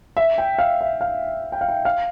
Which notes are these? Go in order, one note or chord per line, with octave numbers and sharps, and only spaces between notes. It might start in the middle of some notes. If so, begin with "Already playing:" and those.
E5
G5
F5
E5
F5
G5
F5
G5
F5